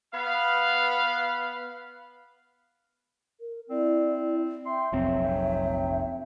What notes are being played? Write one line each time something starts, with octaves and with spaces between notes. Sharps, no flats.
B3 F5 B5
A#4
C4 E4 D5
E5 G5 C6
F1 A#1 F#3 C4